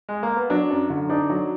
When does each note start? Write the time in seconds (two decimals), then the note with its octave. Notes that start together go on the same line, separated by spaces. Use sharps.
0.09 G#3
0.23 A#3
0.37 B3
0.50 F#3 D4
0.70 F#2
0.90 D3
1.09 D4 D#4
1.30 F#3